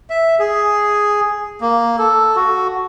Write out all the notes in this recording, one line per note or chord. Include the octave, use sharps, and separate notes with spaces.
E5
G#4
A#3
A4
F#4